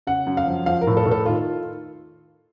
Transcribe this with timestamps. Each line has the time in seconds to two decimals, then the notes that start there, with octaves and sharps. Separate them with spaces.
0.07 C#3 F#5
0.27 F#2
0.37 F5
0.47 F3
0.66 F3 F5
0.81 A#4
0.87 A2
0.97 A4
1.06 A2
1.11 A4
1.26 D#3 F4